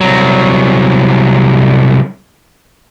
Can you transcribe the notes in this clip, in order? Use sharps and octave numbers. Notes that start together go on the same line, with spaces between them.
C2 F#3